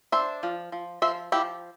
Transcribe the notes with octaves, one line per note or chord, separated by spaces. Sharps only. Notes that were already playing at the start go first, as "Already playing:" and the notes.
D4 C5 E5
F3
F3
F3 C5 E5
F3 E4 G4